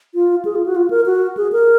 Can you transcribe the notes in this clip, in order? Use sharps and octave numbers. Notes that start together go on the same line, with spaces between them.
F4
G#4
F4
F#4
F4
A#4
F#4
G#4
A#4